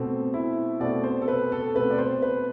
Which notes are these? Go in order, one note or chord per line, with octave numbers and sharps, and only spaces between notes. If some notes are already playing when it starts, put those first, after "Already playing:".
Already playing: B2 A3 C4
E4
B2 A3 C4 D5
C5
A4
B4
A4
B2 A3 C4 B4
D5
C5
B4